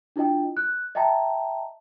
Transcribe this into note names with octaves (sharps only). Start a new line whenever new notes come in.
D4 E4 F4 D#5 G5
F#6
D#5 E5 G5 A5 A#5